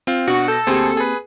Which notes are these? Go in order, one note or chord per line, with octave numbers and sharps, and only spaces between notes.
C4 F4
B2 D4 F#4
A4 G6 A#6
D2 A#3 C4 G4 G#4 C5
G#4 B4